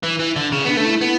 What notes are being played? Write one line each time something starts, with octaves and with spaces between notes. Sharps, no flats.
E3
E3
D3
C#3 C#4
B3 D4
A3 D4
E4
B3 E4